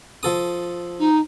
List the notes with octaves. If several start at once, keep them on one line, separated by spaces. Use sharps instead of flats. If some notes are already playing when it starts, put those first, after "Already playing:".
F3 A4 D#6
D#4